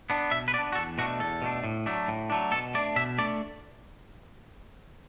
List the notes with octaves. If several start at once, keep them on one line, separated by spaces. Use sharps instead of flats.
B3 D4
B2 E5
B4
B3 D4 D5
F#4
E2 A4
B2 A3 D4 F#4
E2 A4
B2 A3 D4
A2
F#3 A3 D4
A2
F#3 A3 D4
B2 A4
A3 D4 D5
B2 E5
A3 D4 D5